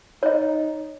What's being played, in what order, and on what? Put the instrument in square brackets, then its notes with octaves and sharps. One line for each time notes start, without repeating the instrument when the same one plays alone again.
[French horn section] D#4 [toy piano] C#5 D#5